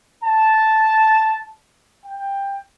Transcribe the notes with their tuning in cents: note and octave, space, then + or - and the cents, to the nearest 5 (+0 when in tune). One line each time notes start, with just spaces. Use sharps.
A5 -5
G5 +15